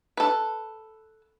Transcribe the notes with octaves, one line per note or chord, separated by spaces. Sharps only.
A4 B4